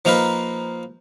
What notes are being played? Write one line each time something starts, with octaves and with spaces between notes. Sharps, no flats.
F3 A#3 D#4 A#4 B4